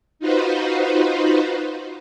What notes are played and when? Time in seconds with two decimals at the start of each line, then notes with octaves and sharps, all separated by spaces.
0.19 D#4 F4 F#4 B4 C5